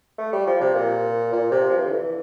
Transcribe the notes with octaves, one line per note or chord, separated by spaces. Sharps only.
A3
G3
F3
C3
A#2
A#2
C3
F3
E3
D3
E3